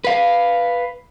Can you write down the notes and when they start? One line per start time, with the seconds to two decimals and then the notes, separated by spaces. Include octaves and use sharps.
0.04 B4 F5